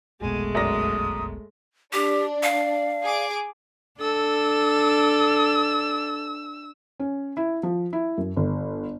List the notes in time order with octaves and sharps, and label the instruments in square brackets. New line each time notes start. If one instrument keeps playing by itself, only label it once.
[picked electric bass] F1 B1 B2 [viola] G#3 A3 [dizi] G#5
[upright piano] F#2 D5 A#6 [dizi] D#6
[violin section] D4 [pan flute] G4 [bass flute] D5
[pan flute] F5
[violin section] G#4 D6
[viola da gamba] D4 [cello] A4 [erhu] E6
[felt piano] C#4
E4
F3
E4
F#2
G1